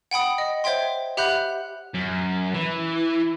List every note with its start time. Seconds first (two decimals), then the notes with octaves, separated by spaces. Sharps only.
0.11 F#5 G5 B5 D#6
0.38 D#5
0.64 C5 C#5 E5 G5 C6
1.17 G4 E5 F#5 B5 F#6 G6
1.94 F#2
2.54 E3